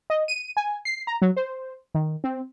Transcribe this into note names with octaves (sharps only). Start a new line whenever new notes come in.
D#5
D#7
G#5
C7
A#5
F#3
C5
D#3
C4